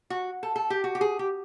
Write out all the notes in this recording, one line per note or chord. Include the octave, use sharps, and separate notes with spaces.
F#4
A4
A4
G4
F#4
G4
G#4
G4